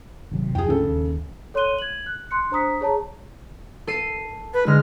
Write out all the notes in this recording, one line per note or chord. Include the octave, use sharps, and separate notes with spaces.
G#1 C3 F#3
F2 G#4 G5
D2 G#2 C#3 D4 A4
D#2
A4 C#5 C6 F#6 D#7 G7
G#6 F#7
F#6
C6 F#6 C#7
D4 C5 A#5 D#6 B6
G#4 C#5 A5 A#5
A4 C7 D#7
B4
D3 G#3 F6